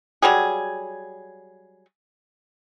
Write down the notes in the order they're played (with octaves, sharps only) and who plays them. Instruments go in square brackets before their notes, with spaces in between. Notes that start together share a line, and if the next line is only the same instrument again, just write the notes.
[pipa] F#3 G3 G#4